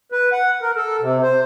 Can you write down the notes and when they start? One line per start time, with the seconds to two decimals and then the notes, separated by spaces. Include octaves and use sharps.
0.12 B4
0.32 F#5
0.61 A#4
0.77 A4
1.01 C3
1.22 C5